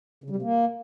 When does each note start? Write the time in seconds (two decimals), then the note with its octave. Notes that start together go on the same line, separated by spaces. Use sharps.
0.24 C#3
0.30 G3
0.36 C3
0.42 A#3